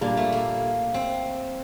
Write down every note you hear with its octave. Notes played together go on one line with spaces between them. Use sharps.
A#2 G3 A#3 D4
A3
A#3
C4